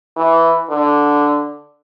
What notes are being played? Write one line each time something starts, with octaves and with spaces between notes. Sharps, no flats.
E3
D3